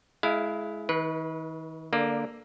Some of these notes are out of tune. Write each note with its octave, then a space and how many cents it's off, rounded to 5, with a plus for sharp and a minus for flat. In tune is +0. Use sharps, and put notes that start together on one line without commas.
G#3 +25 E4 +0 F5 -15
D#3 +45 B4 -15
D3 +0 A#3 +0 D5 +25